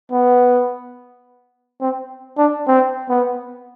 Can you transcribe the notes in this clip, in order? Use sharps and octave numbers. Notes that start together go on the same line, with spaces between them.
B3
C4
D4
C4
B3